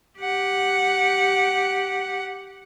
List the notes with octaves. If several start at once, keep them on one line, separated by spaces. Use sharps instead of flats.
G4 F#5